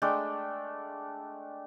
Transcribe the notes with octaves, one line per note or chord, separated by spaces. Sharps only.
G#3 A3 D4 G5